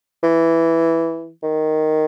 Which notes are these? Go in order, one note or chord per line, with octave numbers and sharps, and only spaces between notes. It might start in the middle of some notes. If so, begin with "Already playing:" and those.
E3
D#3